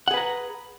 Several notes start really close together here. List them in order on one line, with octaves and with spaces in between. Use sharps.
F#5 G#4 B4 A#5